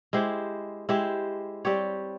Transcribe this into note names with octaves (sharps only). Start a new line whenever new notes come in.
G#3 E4 G4 C5
G#3 E4 G4 C5
G3 C4 G4 C#5